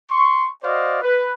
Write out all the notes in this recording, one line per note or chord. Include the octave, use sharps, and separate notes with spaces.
C6 C#6
F#4 C5 D5 D#5 F5
B4